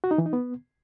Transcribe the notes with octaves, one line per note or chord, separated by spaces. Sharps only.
F#4
D#4
E3
D#4
B3